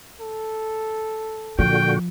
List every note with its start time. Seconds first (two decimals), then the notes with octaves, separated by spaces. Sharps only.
0.21 A4
1.59 A#2 D3 F3 F#4 G5